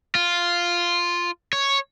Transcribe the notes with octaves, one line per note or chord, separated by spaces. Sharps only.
F4
C#5